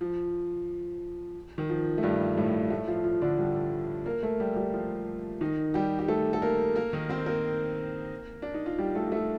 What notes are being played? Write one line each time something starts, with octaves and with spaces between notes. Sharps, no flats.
F3
D#3
F3
A3
G2 G3
A2 A3
A2 A3
F3 F4
F3 F4
D3 D4
G3 G4
A#3 A#4
A3 A4
G3 G4
G3 G4
F3 F4
D#3 D#4
G3 G4
G4
A3 A4
A4
A#3 A#4
A#3 A#4
D#3 D#4
C4 C5
A#3 A#4
D4
D#4
F4
G3 G4
A3 A4
G4
A3 A4